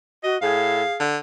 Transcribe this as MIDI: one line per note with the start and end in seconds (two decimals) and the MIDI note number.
0.24 0.38 66
0.24 0.36 75
0.42 0.83 45
0.42 0.94 68
0.42 0.99 77
1.00 1.17 50